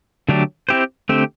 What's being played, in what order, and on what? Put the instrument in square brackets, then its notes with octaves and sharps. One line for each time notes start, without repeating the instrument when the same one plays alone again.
[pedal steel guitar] D3 F#3 A3 D4 G4
C4 E4 G4 C5
D3 A3 C4 G4 C5